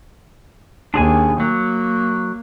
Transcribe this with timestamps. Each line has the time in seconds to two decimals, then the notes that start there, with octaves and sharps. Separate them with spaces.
0.94 D#2 D4 G#4 G#5
1.40 F#3 A#3